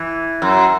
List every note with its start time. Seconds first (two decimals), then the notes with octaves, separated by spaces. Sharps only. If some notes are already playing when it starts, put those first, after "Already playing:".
Already playing: E3
0.42 F#2